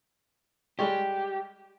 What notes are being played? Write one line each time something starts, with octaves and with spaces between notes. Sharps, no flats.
G3 G#3 G4 C#5